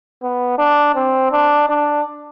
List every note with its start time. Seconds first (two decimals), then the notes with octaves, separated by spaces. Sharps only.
0.23 B3
0.58 D4
0.95 C4
1.32 D4
1.69 D4